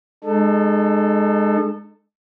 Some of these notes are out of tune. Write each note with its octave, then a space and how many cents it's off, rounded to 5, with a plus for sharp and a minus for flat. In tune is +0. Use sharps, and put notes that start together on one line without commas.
G#3 +0 D#4 -40 A4 +0